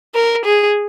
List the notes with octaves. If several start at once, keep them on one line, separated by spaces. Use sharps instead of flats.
A#4
G#4